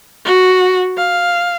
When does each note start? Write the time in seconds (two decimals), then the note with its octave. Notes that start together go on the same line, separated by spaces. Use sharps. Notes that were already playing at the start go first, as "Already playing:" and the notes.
0.25 F#4
0.97 F5